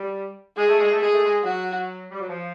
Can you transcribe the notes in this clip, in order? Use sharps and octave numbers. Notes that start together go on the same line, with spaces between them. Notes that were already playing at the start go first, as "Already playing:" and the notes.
Already playing: G3
G#3 G#4
A3
G#3
A3
G#3 G#4
A3
G#3
F#3 F#4
G3
F#3
F3